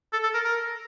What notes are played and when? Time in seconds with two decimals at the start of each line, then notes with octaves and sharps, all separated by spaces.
0.13 A4
0.23 A4
0.34 A#4
0.45 A#4